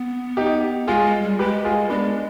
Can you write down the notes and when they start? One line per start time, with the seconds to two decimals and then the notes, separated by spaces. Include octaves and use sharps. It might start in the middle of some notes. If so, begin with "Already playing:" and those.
Already playing: B3
0.37 D#4 G4
0.88 G#3 F4 G#4
1.05 G#3
1.22 G3
1.39 G#3 G4 B4
1.65 F4 G#4
1.89 G#3 B3 D4